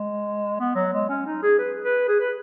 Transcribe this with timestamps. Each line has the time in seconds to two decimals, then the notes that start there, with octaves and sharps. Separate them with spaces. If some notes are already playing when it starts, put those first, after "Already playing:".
Already playing: G#3
0.60 B3
0.75 F#3
0.93 G#3
1.09 C#4
1.26 D#4
1.43 G#4
1.59 B4
1.84 B4
2.08 G#4
2.20 B4